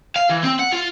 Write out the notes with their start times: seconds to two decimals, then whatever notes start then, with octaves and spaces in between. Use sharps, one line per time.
0.16 F5
0.30 E3
0.44 C4
0.59 F#5
0.72 F4